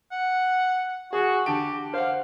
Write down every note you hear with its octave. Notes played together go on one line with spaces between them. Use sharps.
F#5
F#4 G#4
D3 G4 A5 D7
C5 F5 F#5